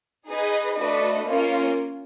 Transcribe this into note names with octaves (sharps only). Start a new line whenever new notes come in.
D#4 G#4 B4 D#5
A3 D4 F#4 B4 D#5
A#3 C#4 F4